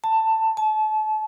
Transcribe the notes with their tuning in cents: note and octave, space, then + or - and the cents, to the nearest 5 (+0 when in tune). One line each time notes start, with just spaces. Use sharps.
A5 +15
A5 -35